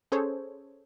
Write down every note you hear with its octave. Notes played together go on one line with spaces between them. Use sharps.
C#4 G#4 A4 C5 C#5